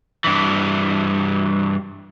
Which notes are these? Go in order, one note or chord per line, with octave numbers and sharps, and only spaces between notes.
G2 E3